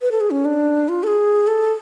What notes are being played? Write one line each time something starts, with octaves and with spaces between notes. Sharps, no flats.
B4
A4
G#4
C#4
D4
F4
A4
G#4
A4